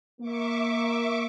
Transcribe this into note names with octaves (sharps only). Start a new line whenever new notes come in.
A#3 E5 C#6 D6